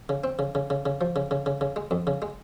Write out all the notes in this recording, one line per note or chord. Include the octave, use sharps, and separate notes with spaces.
C#3
C4
C#3
C#3
C#3
C#3
F3
C#3
C#3
C#3
C#3
G#3
F2
C#3
G#3